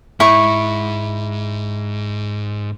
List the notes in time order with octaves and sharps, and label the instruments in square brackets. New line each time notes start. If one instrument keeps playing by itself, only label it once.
[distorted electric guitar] G#2 [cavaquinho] E4 C#6